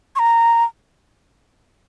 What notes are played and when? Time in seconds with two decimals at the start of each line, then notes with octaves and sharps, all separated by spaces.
0.16 C#6
0.19 A#5